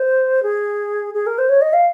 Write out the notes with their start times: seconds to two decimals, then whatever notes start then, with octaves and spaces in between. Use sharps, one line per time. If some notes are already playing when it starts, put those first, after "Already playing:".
Already playing: C5
0.43 G#4
1.14 G#4
1.27 A#4
1.38 C5
1.49 C#5
1.61 D#5
1.73 F5